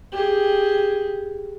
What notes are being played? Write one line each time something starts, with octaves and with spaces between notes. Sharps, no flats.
G4 G#4